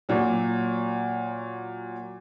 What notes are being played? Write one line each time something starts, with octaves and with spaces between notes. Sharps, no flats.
A#2 F#3